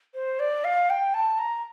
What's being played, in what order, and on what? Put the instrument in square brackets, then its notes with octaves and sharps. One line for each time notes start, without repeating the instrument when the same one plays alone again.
[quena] C5
D5
F5
G5
A5
A#5